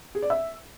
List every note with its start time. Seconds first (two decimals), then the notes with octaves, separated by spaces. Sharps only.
0.15 G#4
0.22 D5
0.30 E5